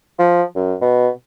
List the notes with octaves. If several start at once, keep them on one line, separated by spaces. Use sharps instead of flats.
F3
F#2
B2